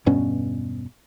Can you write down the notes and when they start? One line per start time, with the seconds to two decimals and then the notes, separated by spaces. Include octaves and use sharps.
0.06 E1 G2 B2 C#4